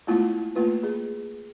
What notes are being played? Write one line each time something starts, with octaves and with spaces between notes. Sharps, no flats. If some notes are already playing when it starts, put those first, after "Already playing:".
G#3 A3 B3 E4 F4
A3 A#3 F4 B4
G#4